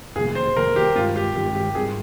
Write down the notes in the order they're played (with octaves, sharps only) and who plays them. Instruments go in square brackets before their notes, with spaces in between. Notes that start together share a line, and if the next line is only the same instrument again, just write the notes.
[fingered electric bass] F2 C3 D#3 A#3 [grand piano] G#4
[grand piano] C5
[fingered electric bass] F2 C3 D#3 A#3 [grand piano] A#4
[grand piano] G4
[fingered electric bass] G2 D#3 G#3 C4 [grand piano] F4
[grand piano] G4
[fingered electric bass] G2 D#3 G#3 C4 [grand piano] G4
[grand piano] G4
[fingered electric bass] G#2 G3 C4 [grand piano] G#4